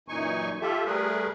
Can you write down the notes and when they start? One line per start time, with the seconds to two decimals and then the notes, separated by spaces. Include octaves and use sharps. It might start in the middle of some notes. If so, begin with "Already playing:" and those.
0.08 F#2 A#2 E3 D#4 G#5 C#6
0.61 F4 G4 A4 E5
0.85 G3 A3 G#4 A#4 B4